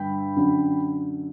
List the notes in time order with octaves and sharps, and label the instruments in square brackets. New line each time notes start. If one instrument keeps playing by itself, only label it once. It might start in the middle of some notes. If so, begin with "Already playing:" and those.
Already playing: [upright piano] G2 D3 G5 B5
F#2 D3